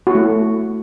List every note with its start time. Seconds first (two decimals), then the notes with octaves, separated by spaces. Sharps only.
0.07 F#4
0.11 E4
0.15 A3